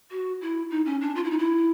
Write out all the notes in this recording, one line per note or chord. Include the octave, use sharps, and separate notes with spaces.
F#4
E4
D#4
C#4
D4
F4
E4
D#4
E4